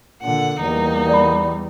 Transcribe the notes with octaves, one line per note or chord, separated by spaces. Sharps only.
A#2 D3 F#5
E2 G3 A#3 D#4
D5 B5